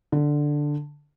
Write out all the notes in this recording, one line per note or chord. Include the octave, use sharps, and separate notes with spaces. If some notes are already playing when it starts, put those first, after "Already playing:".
D3